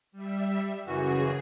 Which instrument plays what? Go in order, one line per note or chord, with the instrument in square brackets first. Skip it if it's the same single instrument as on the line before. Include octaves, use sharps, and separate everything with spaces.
[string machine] G3 E5
[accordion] F#2 E3 F#4 [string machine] C#3 G#4